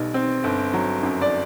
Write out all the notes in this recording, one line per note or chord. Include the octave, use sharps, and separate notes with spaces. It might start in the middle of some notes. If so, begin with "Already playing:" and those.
Already playing: B1 B2 G3
C4
G1
F#3
F#2
D5